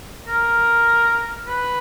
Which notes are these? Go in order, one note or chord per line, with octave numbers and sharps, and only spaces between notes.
A#4
B4